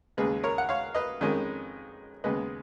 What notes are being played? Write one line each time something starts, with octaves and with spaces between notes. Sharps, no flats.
D#2 C#3 G#3 G#4 B4
A#4 C#5
F#5
C#5 F5
B4 D#5
F2 D#3 G#3 C#4
D#2 C#3 G#3 B3 B4 D#5